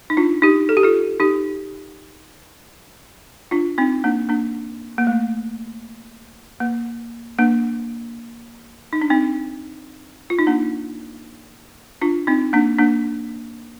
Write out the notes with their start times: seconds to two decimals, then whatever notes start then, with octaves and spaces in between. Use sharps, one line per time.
0.10 D#4
0.17 D4 F4
0.42 D#4 G4
0.69 A4
0.77 G4
0.83 F4 A4
1.20 D#4 G4
3.51 D4 F4
3.78 C4 D#4
4.04 A#3 D4
4.29 A#3 D4
4.98 A#3
5.07 A3
6.60 A#3
7.38 A#3 D4
8.93 D#4
9.02 D4
9.10 C4 D#4
10.30 F4
10.39 D#4
10.47 A#3 D4
12.02 D4 F4
12.27 C4 D#4
12.53 A#3 D4
12.79 A#3 D4